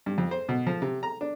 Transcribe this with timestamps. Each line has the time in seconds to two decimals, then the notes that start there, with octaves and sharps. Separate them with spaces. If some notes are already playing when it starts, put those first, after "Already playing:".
0.06 G2
0.18 F2
0.31 C5
0.49 B2
0.67 F3
0.82 C3
1.03 A#5
1.21 D4